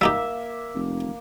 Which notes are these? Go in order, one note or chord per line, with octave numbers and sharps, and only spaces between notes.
G3 A#3 D#4 G4 E5
F1